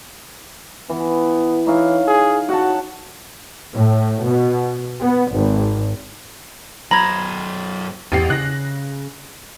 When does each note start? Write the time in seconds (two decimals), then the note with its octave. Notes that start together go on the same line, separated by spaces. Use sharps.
0.90 E3 B3
1.67 E3 D#4 C#5 F5
2.07 G#4
2.49 F#4 F#5 A5
3.73 A2
4.25 B2
5.01 B3
5.33 G#1
6.91 F#2 C5 A#5 B5 G#6
8.12 A1 E2 G4 C7
8.30 C#3 F#6 A#6